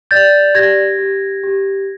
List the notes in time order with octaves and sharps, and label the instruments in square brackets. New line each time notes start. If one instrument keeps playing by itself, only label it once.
[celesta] D5 G6 A6
G4 G#6 A#6
G4
G4